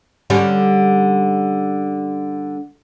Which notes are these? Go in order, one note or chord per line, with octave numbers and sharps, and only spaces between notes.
D3 G3 C#4